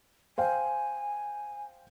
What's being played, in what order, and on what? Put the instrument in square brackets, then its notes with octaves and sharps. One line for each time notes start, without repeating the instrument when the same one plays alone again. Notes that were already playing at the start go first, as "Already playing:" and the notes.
[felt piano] C5 F5 G5 [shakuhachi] G#5